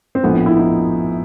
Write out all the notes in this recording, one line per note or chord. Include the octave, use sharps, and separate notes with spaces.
C4
A#1 A2 F3 B3
E4
D#4